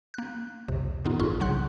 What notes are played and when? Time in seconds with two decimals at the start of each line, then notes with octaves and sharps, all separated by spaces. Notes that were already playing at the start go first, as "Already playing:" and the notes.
0.14 A#3 F#6
0.68 C2 F2 C3
1.05 A2 D#3 B3 D#4 F4
1.20 A1 G2 F4 G#4 C6 C#6
1.40 C2 C#3 F#3 F#5 C6 F#6